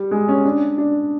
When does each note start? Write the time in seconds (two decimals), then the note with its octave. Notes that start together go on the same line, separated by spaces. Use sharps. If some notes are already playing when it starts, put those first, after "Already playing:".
Already playing: G3
0.11 G#3
0.28 C#4
0.45 D4
0.78 D4